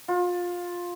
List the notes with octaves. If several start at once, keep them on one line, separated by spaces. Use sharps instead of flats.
F4